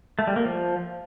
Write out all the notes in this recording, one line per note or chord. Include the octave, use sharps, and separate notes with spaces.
A3
G3
A#3
F3